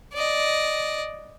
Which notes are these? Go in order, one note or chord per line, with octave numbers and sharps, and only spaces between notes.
D5 D#5